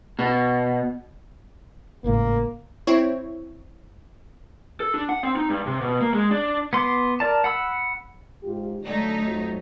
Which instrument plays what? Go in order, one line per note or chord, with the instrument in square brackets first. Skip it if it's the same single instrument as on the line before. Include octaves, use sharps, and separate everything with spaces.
[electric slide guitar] B2
[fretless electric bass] G#1 A2 C#3 [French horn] A#3
[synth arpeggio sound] C4 E4 C#5
[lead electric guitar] A4
D4
F#5
C4
D#4
G2
C3
B2
A#3
G#3
D4
[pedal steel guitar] B3 C6 D6
A#4 D5 A5
F#5 B5 E6
[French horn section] G#2 F4 G4
[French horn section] D3 F#3 [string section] A3 D#4 C#5
[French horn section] F2 F#3